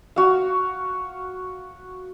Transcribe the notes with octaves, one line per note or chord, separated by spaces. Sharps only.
F#4 F5